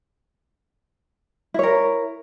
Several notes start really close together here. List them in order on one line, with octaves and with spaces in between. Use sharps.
E4 C#5 A#4